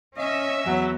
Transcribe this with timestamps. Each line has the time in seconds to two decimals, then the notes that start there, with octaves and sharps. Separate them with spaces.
0.18 C#4 D#5 E5
0.66 E2 F#3